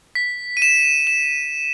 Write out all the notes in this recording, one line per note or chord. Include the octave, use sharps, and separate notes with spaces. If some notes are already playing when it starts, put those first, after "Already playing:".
B6
D#7
E7
E7